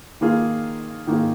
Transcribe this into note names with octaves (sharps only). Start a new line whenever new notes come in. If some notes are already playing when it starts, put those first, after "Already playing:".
D#3 A#3 F4 G#4
D#3 A#3 F4 G#4